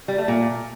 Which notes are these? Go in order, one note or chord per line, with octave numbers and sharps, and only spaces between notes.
G3
A3
A#2